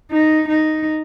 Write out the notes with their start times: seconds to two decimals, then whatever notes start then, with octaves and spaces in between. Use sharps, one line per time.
0.11 D#4
0.48 D#4